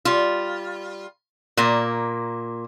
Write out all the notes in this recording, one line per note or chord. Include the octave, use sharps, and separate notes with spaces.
G3 F4
A#2 A#3